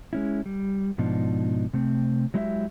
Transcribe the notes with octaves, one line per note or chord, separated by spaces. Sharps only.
G#3 C#4 E4
G3
G#2 B2 F3 D4 D#4
C3 A3 C4
F#3 G#3 E4 G4 B4 E5